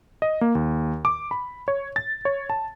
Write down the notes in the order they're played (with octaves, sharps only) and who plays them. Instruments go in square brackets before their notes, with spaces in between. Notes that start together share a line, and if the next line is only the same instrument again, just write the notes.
[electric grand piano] D#5
A#3
D#2
D6
B5
C#5
A6
C#5
A5